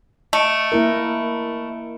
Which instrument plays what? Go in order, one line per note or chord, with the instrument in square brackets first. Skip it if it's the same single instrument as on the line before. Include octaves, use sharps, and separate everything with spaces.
[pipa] A3 [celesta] D#5 C#7 D7
[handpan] A#3 E4 A#4